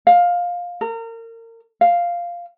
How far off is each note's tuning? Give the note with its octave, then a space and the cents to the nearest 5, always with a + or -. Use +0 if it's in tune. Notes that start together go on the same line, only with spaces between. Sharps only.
F5 +15
A#4 -30
F5 -5